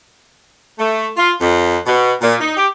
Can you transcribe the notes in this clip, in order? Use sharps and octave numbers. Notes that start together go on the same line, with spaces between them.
A3
F4
F2
B2
A#2
D#4
G4